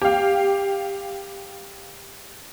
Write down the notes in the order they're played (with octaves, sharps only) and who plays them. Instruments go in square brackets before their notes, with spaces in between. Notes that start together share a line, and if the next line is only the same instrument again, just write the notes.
[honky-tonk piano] G4 F5